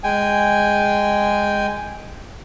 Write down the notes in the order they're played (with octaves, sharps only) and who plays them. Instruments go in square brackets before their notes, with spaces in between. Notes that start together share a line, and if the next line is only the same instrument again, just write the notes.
[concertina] G#3 G5 G#5